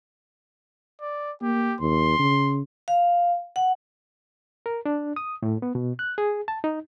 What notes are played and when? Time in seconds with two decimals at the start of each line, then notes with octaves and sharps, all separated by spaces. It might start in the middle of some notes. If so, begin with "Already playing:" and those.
1.01 D5
1.42 A#3 G4
1.81 D#2 C6
2.19 C#3
2.88 F5
3.56 F#5
4.66 A#4
4.86 D4
5.16 D#6
5.43 A2
5.62 B3
5.75 B2
5.99 F#6
6.18 G#4
6.48 A5
6.64 D#4